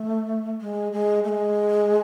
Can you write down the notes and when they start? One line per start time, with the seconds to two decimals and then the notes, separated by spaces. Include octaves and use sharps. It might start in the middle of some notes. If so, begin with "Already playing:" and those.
Already playing: A3
0.61 G#3
0.92 G#3
1.24 A3
1.28 G#3